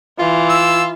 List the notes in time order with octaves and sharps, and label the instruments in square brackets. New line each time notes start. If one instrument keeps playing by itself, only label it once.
[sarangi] E3 [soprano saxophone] F4
[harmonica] E6